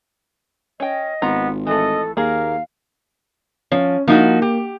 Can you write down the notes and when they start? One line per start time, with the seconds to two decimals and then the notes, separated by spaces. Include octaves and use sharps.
0.80 C#4 D#5 G5
1.22 G#1 B3 F4 A#5
1.67 E3 A3 A4 D#5
2.17 D#2 A#3 G#4 A#4 F5
3.72 F3 C#4
4.07 F3 A#3 D#4 F#4
4.42 G4